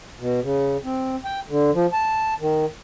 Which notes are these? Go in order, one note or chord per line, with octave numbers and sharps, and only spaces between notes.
B2
C#3
C4
G5
D3
F3
A5
D#3